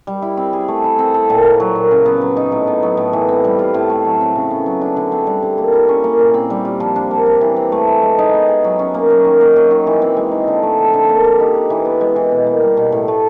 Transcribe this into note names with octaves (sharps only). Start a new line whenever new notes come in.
G3
E4
C4
G#4
A3
E4
C4
A4
A#2
A#3
F#3
A#2
C#3
B3
F#3
D#4
A2
B3
F#3
A2
E3
C4
G3
F4
A2
A3
F#3
C4
C#3
B3
F#3
D4
D3
C4
G3
D3
A#3
E4
C#4
A#3
A#2
C4
G3
F4
F3
D4
A#3
G4
E3
C4
A3
E3
G#3
D#4
B3
G#4
F#3
C#4
A#3
F#3
D#3
A#3
F#3
D#3
E3
C4
G#3
D#4
D3
A3
F3
D3
A#3
G4
D#4
B4
E3
B3
G#3
E3
B2
A#3
G3
B2
A2
A3